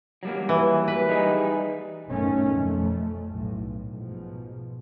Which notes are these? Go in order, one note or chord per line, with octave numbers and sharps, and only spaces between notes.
F#3 G3 A#3
E3
B4
G3 D#4 G#4
A1 F#2 B2 D#3 A3 C#4
F2 A3
B1 A2
G#2 B2 F3